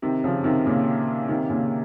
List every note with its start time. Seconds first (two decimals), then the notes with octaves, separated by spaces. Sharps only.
0.02 C3 D#3
0.24 C#3 F3
0.44 C3 D#3
0.65 A#2 C#3
1.28 C3 D#3
1.50 A#2 C#3